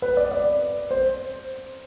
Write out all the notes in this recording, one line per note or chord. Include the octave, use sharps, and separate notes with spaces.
B4
D5
D5
C5